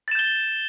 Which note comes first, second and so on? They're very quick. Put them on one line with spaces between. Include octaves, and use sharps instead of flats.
A6 E7 G6 G7